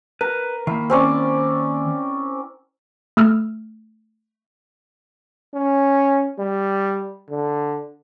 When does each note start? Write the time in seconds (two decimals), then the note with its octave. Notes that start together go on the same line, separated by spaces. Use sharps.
0.21 A#4 B4
0.67 D#3 A#3 E4
0.90 C4 C#4 D5
3.17 A3 E6 F6
5.54 C#4
6.39 G3
7.30 D3